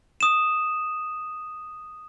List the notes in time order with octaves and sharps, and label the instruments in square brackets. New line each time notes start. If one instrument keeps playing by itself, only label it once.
[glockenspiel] D#6 E7